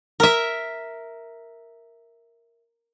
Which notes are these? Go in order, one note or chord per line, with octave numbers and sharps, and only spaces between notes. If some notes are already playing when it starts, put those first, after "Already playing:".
A#4 E5